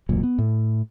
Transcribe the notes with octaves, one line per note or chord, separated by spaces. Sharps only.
E1 C#2 A#2 F#3
B3
A2